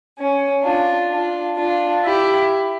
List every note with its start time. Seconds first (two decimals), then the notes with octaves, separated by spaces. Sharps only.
0.17 C#4
0.63 D4 F4
1.11 D4 F4
1.57 D4 F4
2.04 E4 G4